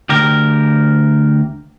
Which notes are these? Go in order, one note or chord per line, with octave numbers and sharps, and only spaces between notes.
D2 G4 A#4